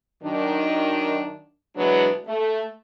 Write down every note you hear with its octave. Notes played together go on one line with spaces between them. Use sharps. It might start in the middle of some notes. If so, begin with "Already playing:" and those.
F#2 D#3 D4
B2 E3 F#3 G#3 B3 D4
A3